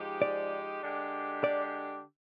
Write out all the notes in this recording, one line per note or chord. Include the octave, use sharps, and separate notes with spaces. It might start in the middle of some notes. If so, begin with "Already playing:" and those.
Already playing: G#2 F3 G#3 D#4 G4
D5
D3 G#3 D4 G4
D5